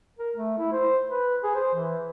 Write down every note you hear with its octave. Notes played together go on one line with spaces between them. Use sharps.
A#4
A3
E4
C5
B4
G#4
C5
E3